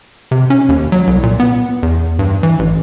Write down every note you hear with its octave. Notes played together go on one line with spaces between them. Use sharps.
C3
C#4
D#2
F#3
C2
A#2
B3
E2
G2
E3
A1